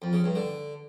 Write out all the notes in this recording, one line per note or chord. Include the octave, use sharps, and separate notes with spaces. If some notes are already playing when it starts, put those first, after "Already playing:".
F2
C#3
G2
D3